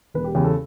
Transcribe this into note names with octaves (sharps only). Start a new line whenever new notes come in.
E1 B4
G4
E2 C#3 G4
A4